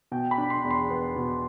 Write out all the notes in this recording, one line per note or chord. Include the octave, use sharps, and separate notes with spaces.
B2 G5
B5
D4
C6
E2
C6
B3
B2